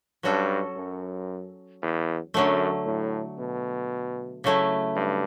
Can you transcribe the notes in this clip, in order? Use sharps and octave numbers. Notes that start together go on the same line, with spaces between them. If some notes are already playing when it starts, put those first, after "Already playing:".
G2 F#3 C#4 F#4 A4
F#2
E2
F#2 D3 F#3 A3
A2
B2
C#3 F#3 A3 E4
G2